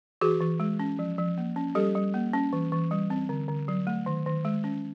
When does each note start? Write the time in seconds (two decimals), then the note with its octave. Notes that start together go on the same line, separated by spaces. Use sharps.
0.21 E3 F#4 G#4
0.41 E3
0.60 G#3
0.79 C#4
0.99 F3
1.18 F3
1.38 A#3
1.56 C#4
1.75 G3 G4 A4
1.95 G3
2.14 A#3
2.33 C#4
2.53 E3
2.72 E3
2.91 G3
3.10 C4
3.29 D3
3.48 D3
3.68 F#3
3.87 A3
4.06 D#3
4.26 D#3
4.45 G#3
4.64 C#4